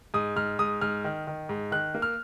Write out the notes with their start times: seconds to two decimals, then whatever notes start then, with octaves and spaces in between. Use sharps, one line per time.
0.14 G#2 D#6
0.36 G#2 F6
0.59 G#2 D#6
0.81 G#2 F6
1.04 D#3
1.27 D#3
1.49 G#2
1.72 D#3 F#6
1.95 A#3
2.02 F6